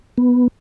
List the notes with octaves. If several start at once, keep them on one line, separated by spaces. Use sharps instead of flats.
B3